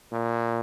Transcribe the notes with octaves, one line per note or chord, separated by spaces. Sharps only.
A#2